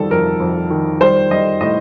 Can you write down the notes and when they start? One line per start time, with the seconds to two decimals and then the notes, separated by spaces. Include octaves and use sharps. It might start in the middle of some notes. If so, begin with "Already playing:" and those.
Already playing: F2 D#3 G3 A4
0.10 F2 A#4
0.40 F2
0.70 D#3
1.01 G3 C5
1.31 G3 D#5
1.61 A2 D#5